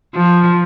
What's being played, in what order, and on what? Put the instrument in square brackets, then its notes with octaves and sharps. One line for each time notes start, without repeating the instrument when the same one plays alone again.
[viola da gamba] F3